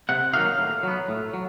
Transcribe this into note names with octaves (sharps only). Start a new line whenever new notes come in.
C3 F#5
D#3 F#3 A#3 D#4 F5
A2
F#3 B3
A2
F#3